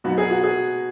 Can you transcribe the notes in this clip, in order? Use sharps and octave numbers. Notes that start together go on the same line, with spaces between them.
B2 F#3 B3 D#4 F#4
G#4
F#4
G#4